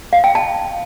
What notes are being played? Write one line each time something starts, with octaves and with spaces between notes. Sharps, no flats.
F5
G5
A5